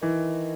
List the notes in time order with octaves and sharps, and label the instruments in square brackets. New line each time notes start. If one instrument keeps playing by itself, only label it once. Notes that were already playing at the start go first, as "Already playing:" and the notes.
[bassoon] D#3 [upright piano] E3